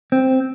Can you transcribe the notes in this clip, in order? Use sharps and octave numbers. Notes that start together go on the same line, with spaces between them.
C4